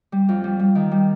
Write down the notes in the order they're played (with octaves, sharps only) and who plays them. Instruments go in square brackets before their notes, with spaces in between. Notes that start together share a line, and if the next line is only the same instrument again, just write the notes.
[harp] G3
F2
G3
G3
D#3
G3